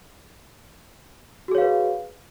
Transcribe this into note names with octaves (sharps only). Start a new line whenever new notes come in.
F#4 G#4 B4 C#5 F5